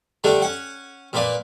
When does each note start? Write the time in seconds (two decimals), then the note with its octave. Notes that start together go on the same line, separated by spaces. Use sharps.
0.24 D3 G3 A3 D4
0.42 C#4 F#5
1.13 A#2 A#3 B4 D5